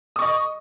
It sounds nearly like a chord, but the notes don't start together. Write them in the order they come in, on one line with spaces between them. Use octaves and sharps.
D#6 C#6 D#5